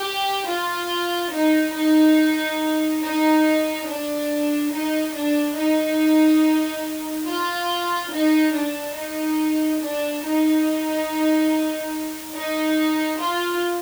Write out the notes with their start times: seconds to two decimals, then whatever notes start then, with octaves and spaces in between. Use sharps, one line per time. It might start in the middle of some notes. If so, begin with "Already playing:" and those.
Already playing: G4
0.47 F4
1.32 D#4
1.75 D#4
3.03 D#4
3.87 D4
4.72 D#4
5.14 D4
5.56 D#4
7.26 F4
8.11 D#4
8.54 D4
8.96 D#4
9.81 D4
10.23 D#4
12.35 D#4
13.20 F4